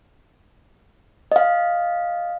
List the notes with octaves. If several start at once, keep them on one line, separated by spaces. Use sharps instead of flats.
D#5 F5